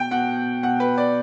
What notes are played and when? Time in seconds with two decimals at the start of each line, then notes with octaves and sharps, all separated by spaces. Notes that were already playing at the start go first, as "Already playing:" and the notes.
Already playing: B2 G5
0.11 B2 F#5
0.63 B2 F#5
0.80 B4
0.98 D5